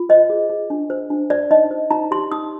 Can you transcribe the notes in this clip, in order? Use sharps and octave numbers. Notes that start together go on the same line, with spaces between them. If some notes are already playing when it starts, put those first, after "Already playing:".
Already playing: F4
C5 D#5
G#4
G#4
D4
C5
D4
C5 D5
D#4 D#5
C5
D#4 A#5
G4 C6
D#4 D#6